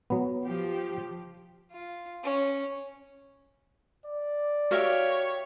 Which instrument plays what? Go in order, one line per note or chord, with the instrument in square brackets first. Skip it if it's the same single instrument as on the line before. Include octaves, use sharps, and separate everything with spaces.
[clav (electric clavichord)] F#3 B3
[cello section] F3 G4
[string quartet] F4
C#4
[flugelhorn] D5
[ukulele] F#4 A#4 [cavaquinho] G4 E5 F5 [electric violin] C#5